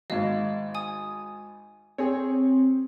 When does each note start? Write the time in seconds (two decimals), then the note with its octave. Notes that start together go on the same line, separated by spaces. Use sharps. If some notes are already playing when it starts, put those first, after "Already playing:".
0.10 G#1 G#2 D#5 F5
0.75 G#5 D#6
1.98 C4 G#4 C#5